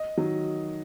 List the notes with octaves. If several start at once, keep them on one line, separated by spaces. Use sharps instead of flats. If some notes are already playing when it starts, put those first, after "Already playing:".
Already playing: D#5
D#3 F#3